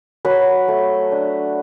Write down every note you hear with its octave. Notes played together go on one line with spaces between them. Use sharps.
F#3 B4
A3
D4